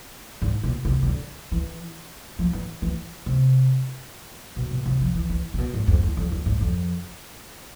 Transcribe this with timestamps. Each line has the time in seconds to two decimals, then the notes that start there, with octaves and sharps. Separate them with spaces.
0.42 G#2
0.63 B2
0.85 C3
1.03 E3
1.07 D3
1.52 E3
2.39 F3
2.53 E3
2.82 E3
3.26 C3
4.56 B2
4.71 B2
4.86 C3
5.01 F3
5.15 E3
5.30 E3
5.54 C3
5.58 B2
5.74 G#2
5.87 F2
6.03 E2
6.17 F2
6.32 E2
6.46 G#2
6.61 F2